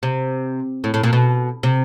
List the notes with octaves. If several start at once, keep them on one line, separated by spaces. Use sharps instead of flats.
C3
A2
A2
A#2
B2
C3